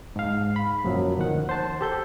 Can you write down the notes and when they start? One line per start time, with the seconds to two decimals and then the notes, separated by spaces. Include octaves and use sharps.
0.16 G#2 F5
0.56 B5
0.84 F#2 A#2 F3 F#3
1.17 D2 D#3 F#5
1.49 C5 A5
1.81 G4 A4 G6